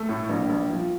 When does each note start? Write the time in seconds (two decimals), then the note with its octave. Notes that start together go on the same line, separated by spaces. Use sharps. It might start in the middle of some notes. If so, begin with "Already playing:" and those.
Already playing: A3 A4
0.09 A2
0.29 A#1
0.50 A#1
0.70 F3